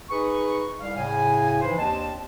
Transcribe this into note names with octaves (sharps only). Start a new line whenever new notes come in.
D#4 G#4 B4 C#6
C2 F5
A2 C#3 G#5
G#2 E3 F3 B4 C5
D#2 C4 D4 D#5 A5